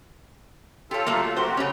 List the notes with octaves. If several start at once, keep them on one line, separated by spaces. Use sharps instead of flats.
F4 G4 A4 C#5
F#3 A3 A#3
F#4 G4 C5
C#3 C#4